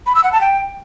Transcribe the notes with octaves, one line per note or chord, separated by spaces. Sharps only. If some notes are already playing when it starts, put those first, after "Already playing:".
B5
E6
F#5
A5
G5